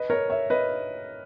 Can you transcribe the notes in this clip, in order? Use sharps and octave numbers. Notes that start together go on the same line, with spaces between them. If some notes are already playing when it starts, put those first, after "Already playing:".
Already playing: B4 D#5
A#4 C#5
C#5 E5
B4 D#5